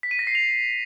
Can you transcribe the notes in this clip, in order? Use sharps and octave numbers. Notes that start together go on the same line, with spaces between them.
B6
D#7
A#6
C7
F7